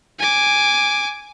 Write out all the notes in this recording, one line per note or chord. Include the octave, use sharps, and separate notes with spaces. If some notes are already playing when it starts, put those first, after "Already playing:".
G#5 D6